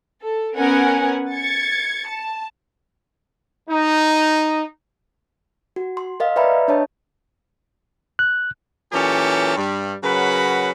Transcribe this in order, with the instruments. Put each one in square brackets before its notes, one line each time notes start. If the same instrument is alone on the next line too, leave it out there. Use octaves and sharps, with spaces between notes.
[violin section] A4
B3 C#4 A#4 F#5 G#5
G#6 A6 C#7
A5
[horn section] D#4
[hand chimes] F#4
C6
A#4 D#5 F5
B4 D5 E5 G5 A#5 B5
D4 C#5 D#5 A5
[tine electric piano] F#6
[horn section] A#2 E3 F#3 C#4 G4 A4
G2 G3
C#3 F#3 A#4 B4 F#5 B5